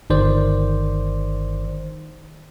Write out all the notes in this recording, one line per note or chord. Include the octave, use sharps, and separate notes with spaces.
G1 D#3 C5 D5